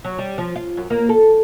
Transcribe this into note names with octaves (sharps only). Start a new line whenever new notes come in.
F#3
G3
F3
F4
F#2
A#3
A4